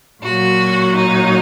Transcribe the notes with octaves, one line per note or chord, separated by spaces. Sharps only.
A#2 F#3 F#4
D#4